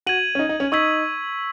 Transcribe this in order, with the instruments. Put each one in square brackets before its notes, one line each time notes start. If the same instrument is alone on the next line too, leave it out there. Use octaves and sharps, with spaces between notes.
[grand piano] F#4 [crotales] G#6 D#7 F#7
[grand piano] C#4
D#4
D#4
C#4
[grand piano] D#4 [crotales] C#6 E6 G#6 B6 F#7